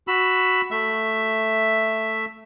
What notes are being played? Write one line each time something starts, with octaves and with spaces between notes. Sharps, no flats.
F#4 B5 E6
A3 E5